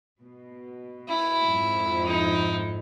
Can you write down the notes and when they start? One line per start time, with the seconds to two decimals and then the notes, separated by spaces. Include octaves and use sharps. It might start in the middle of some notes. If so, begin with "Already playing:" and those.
0.22 B2
1.09 E4
1.46 F2 G#2
2.05 D#4 E4